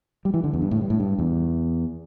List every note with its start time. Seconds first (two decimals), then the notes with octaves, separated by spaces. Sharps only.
0.25 G3
0.34 E3
0.44 D3
0.53 E2
0.62 G2
0.71 A2
0.81 G2
0.90 A2
1.00 G2
1.19 E2